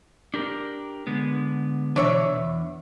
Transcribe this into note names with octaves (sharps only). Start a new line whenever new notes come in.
D4 G4 A#4
D3 G#3 B3
B2 D3 E3 D4 C#5 E5
E2